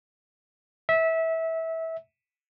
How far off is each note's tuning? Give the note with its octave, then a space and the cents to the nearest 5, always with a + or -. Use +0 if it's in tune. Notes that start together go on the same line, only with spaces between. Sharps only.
E5 -20